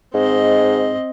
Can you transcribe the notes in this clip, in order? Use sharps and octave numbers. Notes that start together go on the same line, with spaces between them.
G#2 C4 D#5